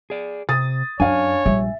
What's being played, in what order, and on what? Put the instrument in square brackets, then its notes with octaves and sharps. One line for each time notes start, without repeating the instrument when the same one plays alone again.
[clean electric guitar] G#4 D5
[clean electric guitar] C3 [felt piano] D#6 A6
[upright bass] F#2 [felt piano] D4 F5 [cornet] C#5 [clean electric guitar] G#5
[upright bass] A#1 G3 [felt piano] E5